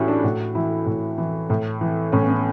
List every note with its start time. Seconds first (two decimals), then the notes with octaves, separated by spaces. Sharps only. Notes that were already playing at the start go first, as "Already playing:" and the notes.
Already playing: A2 E3 C#4 E4 F#4 G4
0.08 D4
0.23 A2 F#4
0.55 E3 E4
0.86 A2
1.18 E3
1.50 A2
1.81 E3
2.12 A2 C#4
2.22 B3
2.29 C#4